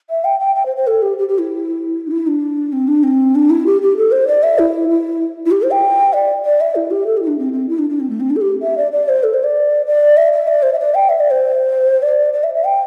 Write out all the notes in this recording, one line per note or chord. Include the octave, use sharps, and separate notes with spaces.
E5
G5
G5
G5
C5
C5
A4
G4
G4
G4
E4
D4
E4
D4
C4
D4
C4
D4
E4
G4
G4
A4
C5
D5
E5
E4
E4
E4
G4
C5
G5
D5
D5
E5
E4
G4
A4
G4
E4
D4
C4
C4
E4
D4
D4
C4
A3
C4
D4
A4
G4
E5
D5
D5
C5
A4
C5
D5
D5
E5
E5
D5
C5
E5
D5
G5
E5
D5
C5
D5
D5
E5
E5
G5